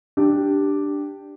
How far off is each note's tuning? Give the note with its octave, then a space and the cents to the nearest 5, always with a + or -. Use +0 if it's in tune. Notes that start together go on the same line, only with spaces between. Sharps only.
D4 +0 G4 +0